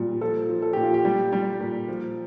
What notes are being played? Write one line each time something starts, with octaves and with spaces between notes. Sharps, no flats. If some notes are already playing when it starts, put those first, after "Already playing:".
Already playing: A#2 G3
F3 A4
F3
A4
A#2 G4
F4
G4
G3
G3
A#2
F3